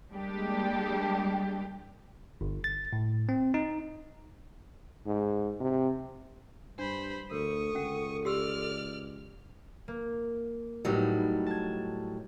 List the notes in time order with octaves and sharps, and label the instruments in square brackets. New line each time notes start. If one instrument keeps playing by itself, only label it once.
[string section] G3 G#3 A#3 D4 G4
[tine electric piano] G1
A6
A2
C4
D#4
[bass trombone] G#2
C3
[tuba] G2 [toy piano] D4 [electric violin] C5 B5
[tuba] D2 [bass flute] A4 [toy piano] A#4 [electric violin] C#6 D#6
[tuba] C#2 [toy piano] C#4 F#5
[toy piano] G4 C6 E6 [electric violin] D5 F6
[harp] A#3
[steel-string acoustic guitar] A2 F#3 G3 [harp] B3 D#4
[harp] A5 G#6